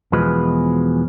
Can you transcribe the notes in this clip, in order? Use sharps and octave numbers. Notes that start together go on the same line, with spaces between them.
E2 B2 F3 G#3 B4